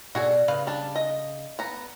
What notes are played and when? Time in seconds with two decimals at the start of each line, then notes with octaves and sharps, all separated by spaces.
0.15 B2 F#4 G#4 A4 D5
0.48 C#3 B4 F5
0.67 G3 D4 A5
0.96 D#5
1.59 B3 A#5